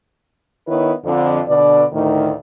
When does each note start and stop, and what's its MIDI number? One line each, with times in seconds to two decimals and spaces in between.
0.68 0.93 51
0.68 0.93 59
0.68 0.93 63
0.68 0.93 64
0.68 0.93 71
0.68 0.93 73
1.05 1.40 41
1.05 1.40 50
1.48 1.84 47
1.48 1.84 50
1.48 1.84 74
1.93 2.32 38
1.93 2.32 45
1.93 2.32 51